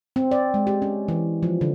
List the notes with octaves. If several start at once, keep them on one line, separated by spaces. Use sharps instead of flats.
C4
D5
G#3
G4
C#4
E3
F3
D3